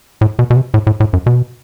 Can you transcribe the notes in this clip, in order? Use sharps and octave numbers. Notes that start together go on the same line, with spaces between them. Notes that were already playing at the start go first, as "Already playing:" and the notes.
A2
B2
B2
C3
A2
A2
A2
F#2
B2